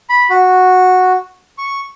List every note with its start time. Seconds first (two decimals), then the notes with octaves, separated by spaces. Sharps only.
0.09 B5
0.30 F#4
1.58 C#6